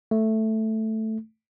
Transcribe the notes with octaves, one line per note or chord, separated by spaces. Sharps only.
A3